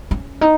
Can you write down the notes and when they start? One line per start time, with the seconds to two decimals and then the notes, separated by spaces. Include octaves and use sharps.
0.11 C#4
0.41 D#4